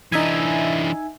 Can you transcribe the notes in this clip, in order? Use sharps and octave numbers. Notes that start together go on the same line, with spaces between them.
E3 D4 D#4 E5 G#5